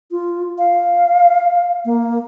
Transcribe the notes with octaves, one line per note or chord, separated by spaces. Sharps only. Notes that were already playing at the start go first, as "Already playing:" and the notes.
F4
F5
A#3